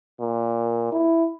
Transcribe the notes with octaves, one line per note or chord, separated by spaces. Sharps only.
A#2
E4